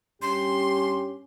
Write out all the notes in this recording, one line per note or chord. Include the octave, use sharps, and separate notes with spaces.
G2 C#4 G4 C6